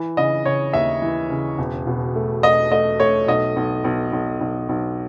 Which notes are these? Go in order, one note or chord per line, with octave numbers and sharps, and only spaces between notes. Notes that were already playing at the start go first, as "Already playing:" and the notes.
Already playing: E3
C#3 D#5
C#3 C#5
D#2 E5
E3
C#3
E1
B2
A3
A3 D#5
A3 D#5
A3 C#5
B1 D#5
B1
B1
B1
B1
B1